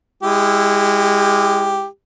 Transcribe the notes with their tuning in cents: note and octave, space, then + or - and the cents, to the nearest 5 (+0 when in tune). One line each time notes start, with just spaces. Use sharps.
G#3 -25 E4 +0 G4 +0